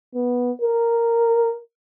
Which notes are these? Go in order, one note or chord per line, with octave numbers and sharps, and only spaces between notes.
B3
A#4